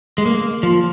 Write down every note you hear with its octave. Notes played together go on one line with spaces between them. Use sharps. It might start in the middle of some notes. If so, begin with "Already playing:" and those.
G#3
A#3
F3